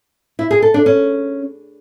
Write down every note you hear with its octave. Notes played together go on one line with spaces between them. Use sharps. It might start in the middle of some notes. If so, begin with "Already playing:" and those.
E4
G#4
A4
D4
C#4